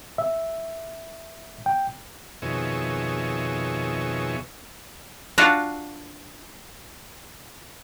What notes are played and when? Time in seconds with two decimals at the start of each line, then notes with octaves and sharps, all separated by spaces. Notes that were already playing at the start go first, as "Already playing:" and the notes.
0.18 E5
1.66 G5
2.42 F2 B2 D#3 G#4 C#5 E5
5.38 D4 F4 F#4